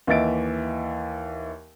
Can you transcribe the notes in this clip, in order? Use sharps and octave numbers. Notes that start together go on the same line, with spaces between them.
D#2 E3 D#5 E5 A6 D7